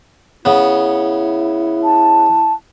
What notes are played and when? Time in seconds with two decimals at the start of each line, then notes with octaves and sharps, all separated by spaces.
0.45 C#3 B3 E4
1.84 A5